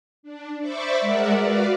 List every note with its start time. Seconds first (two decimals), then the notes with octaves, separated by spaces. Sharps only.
0.23 D4
0.60 C5 D5 E5 B5 C#6 D6
1.01 G#3 A#4 D5 E5 F#5
1.33 F#4 B4 D5 F5